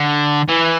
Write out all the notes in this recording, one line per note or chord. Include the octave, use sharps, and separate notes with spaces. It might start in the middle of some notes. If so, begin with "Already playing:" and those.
Already playing: D3
E3